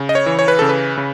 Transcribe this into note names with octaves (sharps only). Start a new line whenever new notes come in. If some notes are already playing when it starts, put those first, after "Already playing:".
Already playing: C#3
D#5
C#5
E3
C#5
B4
C#3 A4
B4
C#3